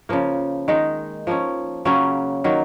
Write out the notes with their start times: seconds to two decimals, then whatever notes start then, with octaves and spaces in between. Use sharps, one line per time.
0.09 C#3 F3 A#3
0.68 D#3 G#3 D#4
1.27 F3 A#3 C#4
1.85 C#3 F#3 A#3 C#4
2.44 D#3 F#3 A#3